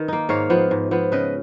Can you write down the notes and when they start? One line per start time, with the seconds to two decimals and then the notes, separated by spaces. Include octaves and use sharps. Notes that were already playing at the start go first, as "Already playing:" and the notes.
Already playing: D#3 B4
0.08 A#3 D#4
0.29 G#2 C#5 F5
0.50 F3 B3
0.71 G#2
0.91 F3 B3
1.12 C#3 B4 D#5